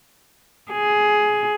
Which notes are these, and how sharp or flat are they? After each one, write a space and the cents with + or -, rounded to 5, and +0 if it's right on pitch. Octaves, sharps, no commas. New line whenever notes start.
G#4 +10